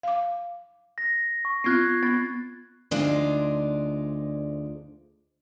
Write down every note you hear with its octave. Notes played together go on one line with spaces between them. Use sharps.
F5 D6
A#6
C#6
B3 C4 F4 F#6 G#6 C7
B3 F4 A6
D2 G#3 D4 D#4 F4 C5